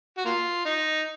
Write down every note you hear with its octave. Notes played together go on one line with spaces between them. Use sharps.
F#4
A#3 F4
D#4